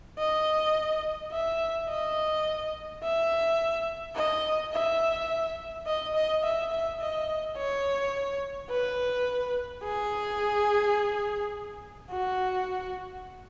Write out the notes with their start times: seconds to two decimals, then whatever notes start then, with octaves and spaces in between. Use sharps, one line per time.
0.18 D#5
1.32 E5
1.88 D#5
3.03 E5
4.15 D#5
4.72 E5
5.86 D#5
6.14 D#5
6.44 E5
6.72 E5
7.00 D#5
7.56 C#5
8.70 B4
9.84 G#4
12.11 F#4